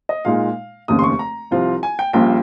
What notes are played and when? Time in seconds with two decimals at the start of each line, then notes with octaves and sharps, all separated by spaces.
0.09 D#5
0.25 A#2 G#3 D#4 F5
0.88 F1 D#2 C#3 D#6
0.99 C6
1.04 C#6
1.19 A#5
1.51 C2 C3 F3 C4 F4
1.83 G#5
1.99 G5
2.13 A#1 A#2 G3 C#4 F4 G5